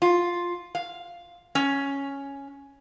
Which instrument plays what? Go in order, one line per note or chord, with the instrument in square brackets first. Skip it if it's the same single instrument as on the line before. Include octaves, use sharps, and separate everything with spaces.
[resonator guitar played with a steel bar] F4
F5
C#4